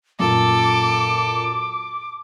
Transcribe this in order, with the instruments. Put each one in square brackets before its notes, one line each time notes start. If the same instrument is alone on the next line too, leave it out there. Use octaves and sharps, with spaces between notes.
[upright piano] F#2 A#2 [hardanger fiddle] A4 [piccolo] D6